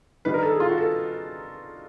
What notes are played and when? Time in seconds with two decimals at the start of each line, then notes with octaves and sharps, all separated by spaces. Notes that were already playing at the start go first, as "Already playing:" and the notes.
0.25 G2 D#3 G3 B4
0.34 A#4
0.43 A4
0.52 G#4
0.60 F4
0.69 F#4
0.78 A4